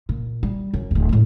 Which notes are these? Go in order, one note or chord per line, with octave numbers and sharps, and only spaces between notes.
A#2
G3
F#2
D1 D#2
A2 G#3